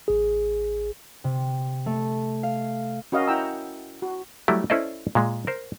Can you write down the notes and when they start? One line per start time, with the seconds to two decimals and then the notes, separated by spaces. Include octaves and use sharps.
0.08 A1 G#4
1.24 C3
1.86 A3
2.43 F5
3.12 C#4 F#4 A#4 D#5 F5
3.27 E4 F#5 G5 A#5 E6
4.02 F#4
4.48 F#3 G3 A3 E4 G4
4.70 C#4 E4 A4 C5 D5 D#5
5.15 A#2 G#3
5.47 A#4 C5